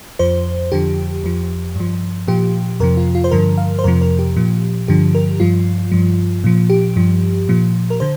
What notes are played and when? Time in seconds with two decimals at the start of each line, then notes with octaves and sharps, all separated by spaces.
0.19 F2 F3 C5
0.72 F2 D3 F3 G4
1.24 F2 F3
1.75 G2
1.80 F3
2.28 A#2 F3 G4
2.80 F2 C3 F3 A#4
2.97 F4
3.15 F4
3.24 C5
3.31 G2 D3 F3 A#4
3.57 F5
3.79 C5
3.84 F2 C3 F3 A#4
4.01 A#4
4.19 G4
4.37 A#2 F3
4.88 G2 D3 F3 G4
5.15 A#4
5.40 G2 F3 F4
5.92 G2 F3
6.44 A#2 F3
6.70 G4
6.96 G2 F3
7.49 A#2 F3
7.90 A#4
8.00 D3 C5